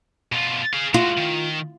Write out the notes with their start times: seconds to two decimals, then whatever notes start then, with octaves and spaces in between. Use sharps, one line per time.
0.32 B2 F4
0.74 G#4 F5
0.94 G#3 F4 F#4
1.18 D#3